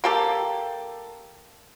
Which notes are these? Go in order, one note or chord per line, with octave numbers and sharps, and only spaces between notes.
A#3 G4 A4